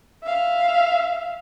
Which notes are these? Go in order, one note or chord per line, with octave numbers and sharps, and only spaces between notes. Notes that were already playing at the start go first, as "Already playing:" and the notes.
E5 F5